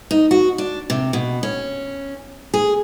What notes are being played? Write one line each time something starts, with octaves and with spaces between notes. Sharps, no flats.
D#4
F#4
D4
C3
B2
C#4
G#4